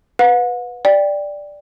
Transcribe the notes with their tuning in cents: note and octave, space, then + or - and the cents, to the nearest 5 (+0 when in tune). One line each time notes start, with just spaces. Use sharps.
B4 +0 F#5 -45
D5 +0 G5 +10